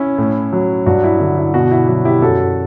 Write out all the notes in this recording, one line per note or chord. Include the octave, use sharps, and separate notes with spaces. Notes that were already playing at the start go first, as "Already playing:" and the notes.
Already playing: C#4 E4
A2
F#3
G2 F#4
E4
D3
E4
B2 F#4
E4
F#3 F#4
E4 G4
F#2 F#4 A4